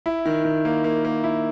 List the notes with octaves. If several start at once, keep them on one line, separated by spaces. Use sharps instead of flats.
E4
D#3
D#3
A#3
A#3
A#3
E4